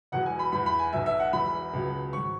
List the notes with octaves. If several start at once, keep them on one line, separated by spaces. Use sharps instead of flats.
E1 E2 B2 F#3 F#5
G#5
B5
E2 E3 B5
B5
G#5
B1 B2 F#3 E5
E5
F#5
E1 E2 E3 B5
C#2 B2 F#3
G#1 F#3 C#6